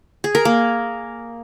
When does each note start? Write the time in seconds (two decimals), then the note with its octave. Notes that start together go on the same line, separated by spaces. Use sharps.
0.24 G#4
0.35 A#4
0.45 A#3